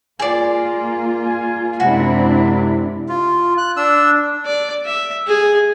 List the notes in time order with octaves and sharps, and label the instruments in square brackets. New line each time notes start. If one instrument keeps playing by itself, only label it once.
[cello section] A#3 F4 [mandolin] G#4 D5
[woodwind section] G#5
[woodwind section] F#2 C3 G#3 [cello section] C4 D4 E4 [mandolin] F#4
[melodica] F4
[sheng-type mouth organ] F#6
[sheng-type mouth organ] D4 [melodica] E6
[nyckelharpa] D5
E5
G#4